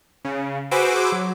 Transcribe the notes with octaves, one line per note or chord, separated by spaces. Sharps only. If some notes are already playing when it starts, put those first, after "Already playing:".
C#3
F#4 G#4 B4 C5 D6 E6
F#3